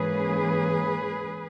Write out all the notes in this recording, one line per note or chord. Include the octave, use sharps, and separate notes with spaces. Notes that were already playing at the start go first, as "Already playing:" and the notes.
Already playing: G#2 E3 A#3 C#4 G#4 B4